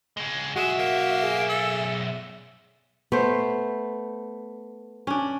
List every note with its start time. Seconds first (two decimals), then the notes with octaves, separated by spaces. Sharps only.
0.17 C#2 G#3
0.56 B1 G#3 F#4 E5
0.79 A#3
1.23 G#4
1.49 A4
3.12 A3 B3 C5
5.07 C#4 D4